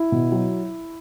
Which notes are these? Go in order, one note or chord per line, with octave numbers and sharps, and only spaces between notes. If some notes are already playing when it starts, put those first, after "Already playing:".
Already playing: E4
B2
F#3